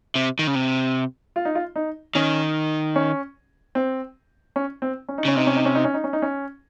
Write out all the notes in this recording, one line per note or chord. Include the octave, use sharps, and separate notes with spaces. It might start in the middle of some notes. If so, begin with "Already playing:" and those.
C3
D#3
C#3
C3
F4
D#4
F4
D#4
D#3 C#4
C#4
C4
C#4
C4
C#4
D#4
C#3 C#4
C3 D#4
C#4
D#4
C#4
D#4
C#4
D#4
C#4
D#4
C#4